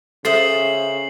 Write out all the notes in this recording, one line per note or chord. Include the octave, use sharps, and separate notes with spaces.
C#3 A4 C5 E5 D#6 C7 F#7